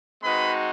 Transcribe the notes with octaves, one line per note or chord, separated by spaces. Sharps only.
G#3 C4 D#4 F#4 B4 B5